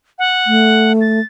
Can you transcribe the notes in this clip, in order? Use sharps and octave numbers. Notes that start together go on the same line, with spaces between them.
F#5
A3
A6